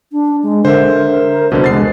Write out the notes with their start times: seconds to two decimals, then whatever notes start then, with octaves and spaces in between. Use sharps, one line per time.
0.12 D4
0.42 G#3
0.65 D3 A#4 C5 E5
1.52 E1 C2 B2 D3 C5
1.64 G#3 A6 C7